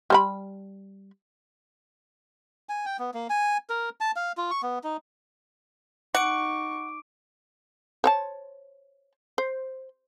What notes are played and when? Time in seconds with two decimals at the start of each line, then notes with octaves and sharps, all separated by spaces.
0.10 G3 C5 B5
2.69 G#5
2.86 G5
2.99 B3
3.14 A#3
3.30 G#5
3.70 A#4
4.01 A5
4.16 F5
4.37 F4
4.51 C#6
4.63 B3
4.84 D#4
6.15 D#4 F#5 C#6 D6 D7
8.04 C5 C#5 A5
9.38 C5